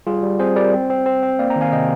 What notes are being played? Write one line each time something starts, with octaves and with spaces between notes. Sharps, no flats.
G3 F4 G#4
G3
C4 G#4 C5
G3 A#4 D5
C4
C4
C4
C4
A#3 D5 F5
G5 A#5
D#3
F5 G#5
C3 D#5 G5